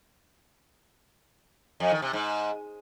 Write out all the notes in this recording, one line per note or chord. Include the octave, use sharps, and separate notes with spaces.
F2
D#3
C3
G#2